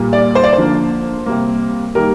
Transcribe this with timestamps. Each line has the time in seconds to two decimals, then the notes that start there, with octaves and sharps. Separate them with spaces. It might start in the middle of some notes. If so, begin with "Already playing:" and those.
Already playing: A#2 G3 A#3
0.13 D5
0.35 C5
0.44 D5
0.53 C5
0.58 D3 F3 A#3
1.26 C3 G3 A#3
1.95 D#3 G3 A#3 A#4